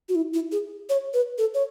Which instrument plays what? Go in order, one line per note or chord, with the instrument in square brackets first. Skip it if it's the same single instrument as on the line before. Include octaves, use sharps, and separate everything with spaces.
[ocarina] F#4
E4
E4
G#4
C#5
B4
A4
C#5